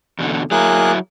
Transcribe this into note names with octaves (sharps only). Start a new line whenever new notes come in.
E2 B2 D3
F#3 A#3 E4 G#4 F#6